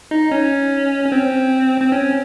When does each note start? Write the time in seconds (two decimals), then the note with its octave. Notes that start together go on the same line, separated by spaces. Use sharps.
0.11 D#4
0.31 C#4
1.05 C#4
1.12 C4
1.81 C4
1.92 C#4